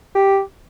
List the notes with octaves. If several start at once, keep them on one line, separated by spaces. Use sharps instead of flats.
G4